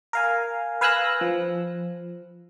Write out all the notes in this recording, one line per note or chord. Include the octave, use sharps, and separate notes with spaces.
A#4 F5 G#5
B4 F5 G#5 E6 F#6 A#6
F3